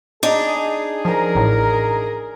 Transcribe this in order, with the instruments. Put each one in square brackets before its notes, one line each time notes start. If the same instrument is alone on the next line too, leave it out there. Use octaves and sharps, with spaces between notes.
[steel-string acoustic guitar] D4 D#4 [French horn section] G#4
[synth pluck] F3 [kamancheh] A#4 A#5
[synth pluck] A1 A2